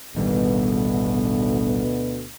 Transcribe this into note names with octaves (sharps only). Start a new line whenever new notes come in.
A1 D2 B2 D#3 G3